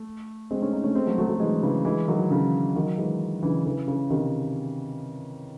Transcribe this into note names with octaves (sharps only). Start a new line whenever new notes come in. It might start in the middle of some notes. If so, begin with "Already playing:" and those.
Already playing: A3
G#3 C4
A3 C#4
C4 D#4
A3 C#4
G#3 C4
F#3 A3
F#3 A3
F#3 A3
E3 G#3
C#3 E3
E3 G#3
D#3 F#3
C#3 E3
D#3 F#3
E3 G#3
C#3 E3
C#3 E3
C#3
C3 D#3